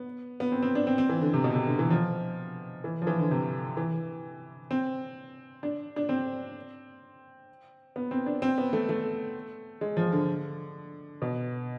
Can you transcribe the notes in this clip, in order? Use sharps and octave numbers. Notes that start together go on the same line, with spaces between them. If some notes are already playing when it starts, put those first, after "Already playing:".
Already playing: B3
B3
C4
C4
D4
C4
C4
E3
D3
C3
B2
C3
D3
E3
F3
E3
F3
E3
D3
C3
E3
C4
D4
D4
C4
B3
C4
D4
C4
B3
A3
A3
G#3
F3
D3
B2